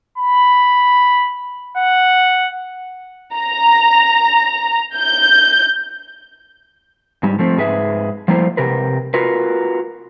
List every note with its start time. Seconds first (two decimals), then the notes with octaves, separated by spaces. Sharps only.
0.18 B5
1.77 F#5
3.35 A#5
4.97 G6
7.23 G#2 G3
7.39 F3 A3 C4
7.57 G#2 G#4 B4 E5
8.28 F3 G3 A3 A#3 E4 C5
8.57 C3 G4 A#4 B4
9.14 F4 F#4 A#4 B4